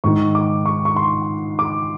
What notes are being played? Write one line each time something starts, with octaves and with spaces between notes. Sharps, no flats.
G#2 D#3 C#6
D6
C#6
C#6
C6
D6